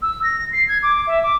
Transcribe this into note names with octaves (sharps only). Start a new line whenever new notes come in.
E6
A#6
C7
G#6
D6
E5
D6